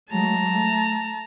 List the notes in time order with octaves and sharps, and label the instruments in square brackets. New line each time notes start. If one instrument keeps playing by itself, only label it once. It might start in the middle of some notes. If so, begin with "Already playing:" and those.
[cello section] F#3 G#3 A3 [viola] A5 A#5
[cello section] A3